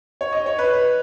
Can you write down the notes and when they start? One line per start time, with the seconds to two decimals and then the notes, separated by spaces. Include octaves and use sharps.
0.21 C#5
0.33 D#5
0.46 C#5
0.59 B4